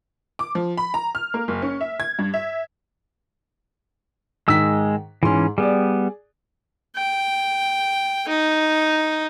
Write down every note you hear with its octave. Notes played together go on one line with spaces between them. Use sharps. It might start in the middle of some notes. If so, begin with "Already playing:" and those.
D6
F3
B5
A#5
F6
A#3
F#1
C#4
E5
G#6
G2
E5
G#2 D#3 G#3 E6 B6
G#2 E3 C#4 C6
G3 B3 G#4 D5
G5
D#4